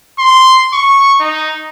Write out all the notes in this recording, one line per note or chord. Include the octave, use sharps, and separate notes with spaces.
C6
C#6
D#4